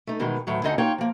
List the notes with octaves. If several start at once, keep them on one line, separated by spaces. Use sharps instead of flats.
A3 D#4
B2 D#3 E3 G#3
D2 A2 D#3 E3 F#3
D2 D3 D#4 D#5 F#5 G#5
A#3 D#4 F4 C#5 G5
F3 A#3